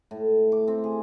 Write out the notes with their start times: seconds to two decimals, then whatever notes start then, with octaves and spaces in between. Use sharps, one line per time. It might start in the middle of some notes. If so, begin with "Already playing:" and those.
0.11 A2
0.52 D6
0.68 C4
0.84 G#4